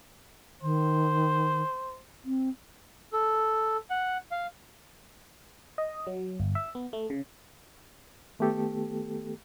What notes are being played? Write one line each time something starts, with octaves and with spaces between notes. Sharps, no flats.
D#3 C5
C4
A4
F#5
F5
D#5
F#3
G1
E5
B3
A3
C#3
D#3 A3 B3 G4 A4